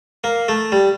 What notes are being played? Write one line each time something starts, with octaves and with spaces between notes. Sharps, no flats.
A#3
A3
G3